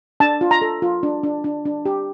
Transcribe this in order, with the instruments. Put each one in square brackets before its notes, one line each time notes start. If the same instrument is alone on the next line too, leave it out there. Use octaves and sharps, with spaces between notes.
[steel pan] D4 A5
F4
A#5
A4
F4
D4
D4
D4
D4
G4